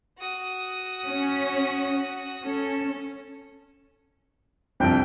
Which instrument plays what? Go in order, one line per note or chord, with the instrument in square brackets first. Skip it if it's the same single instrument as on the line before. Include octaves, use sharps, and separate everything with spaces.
[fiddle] F#4 D#6
[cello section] C#4
[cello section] C#4 [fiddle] A4
[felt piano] C2 F2 D7 [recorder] G5